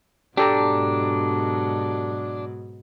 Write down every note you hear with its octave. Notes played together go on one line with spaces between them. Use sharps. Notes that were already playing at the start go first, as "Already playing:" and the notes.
G#2 B2 F#3 D4 G4 A4 A#5